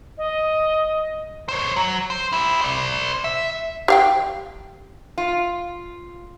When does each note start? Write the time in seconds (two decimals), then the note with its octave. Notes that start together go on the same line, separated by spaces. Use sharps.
0.18 D#5
1.48 C5 C#5
1.76 F#3
2.10 C5
2.33 E4 G4
2.61 C5 D5
3.24 E5
3.88 G4 F5 G5
5.18 F4